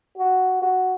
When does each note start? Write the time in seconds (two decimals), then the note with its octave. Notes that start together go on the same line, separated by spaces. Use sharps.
0.18 F#4
0.62 F#4